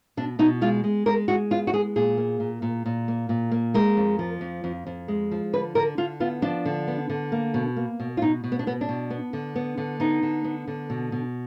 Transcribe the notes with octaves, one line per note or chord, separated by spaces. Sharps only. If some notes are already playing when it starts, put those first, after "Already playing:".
B2 D4
B2 D#4
G#3 F4
G#3
G#3 A#4
G#3 F#4
B3 F4
F#4
G#3 G#4
A#2 G#4
A#3
A#2
A#2
A#2
A#3
A#2
A#3
G#3 A#4
F2
F3
F2
F2
F2
G#3
F3
D3 B4
D3 A#4
D3 F4
B3 F4
F3 D4
D3
B3
D3
A#3
B2
A#3
B2
F4
B2 D#4
B2
B3
D4
B2 B3
D4
B2
B3
D3
B3
D3
B3 D#4
D3
B3
D3
B2
B2